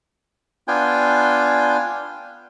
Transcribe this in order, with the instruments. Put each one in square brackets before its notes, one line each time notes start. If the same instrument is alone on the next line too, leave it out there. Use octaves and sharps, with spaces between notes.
[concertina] B3 D4 F4 G5 G#5